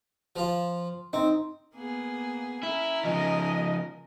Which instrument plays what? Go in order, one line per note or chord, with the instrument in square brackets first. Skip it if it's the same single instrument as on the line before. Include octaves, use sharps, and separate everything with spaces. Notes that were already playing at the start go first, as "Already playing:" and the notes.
[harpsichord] F3 F4
[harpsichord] C4 [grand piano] D#4
[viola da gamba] A#3 B3 G#4
[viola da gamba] C#4 A#4 [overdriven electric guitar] E4
[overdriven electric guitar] C#3 F3 [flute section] D#5